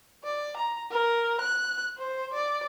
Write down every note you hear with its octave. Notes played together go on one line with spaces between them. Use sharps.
D5
A#5
A#4
F#6
C5
D5